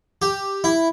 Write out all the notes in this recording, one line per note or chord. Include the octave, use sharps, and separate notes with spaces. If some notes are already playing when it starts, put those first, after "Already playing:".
G4
E4